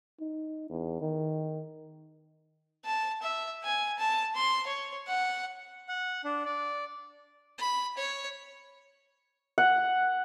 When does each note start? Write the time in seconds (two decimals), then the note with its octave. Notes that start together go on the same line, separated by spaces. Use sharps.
0.20 D#4
0.70 E2
1.01 D#3
2.85 A5
3.22 E5
3.64 G#5
3.99 A5
4.36 C6
4.67 C#5
5.07 F#5
5.89 F#5
6.24 D4
6.45 D5
7.58 B5
7.97 C#5
9.58 F#5